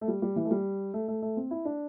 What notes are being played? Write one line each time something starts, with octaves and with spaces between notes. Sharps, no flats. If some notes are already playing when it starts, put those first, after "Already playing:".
A3
G3
G3
E3
A3
G3
A3
A3
A3
C4
E4
D4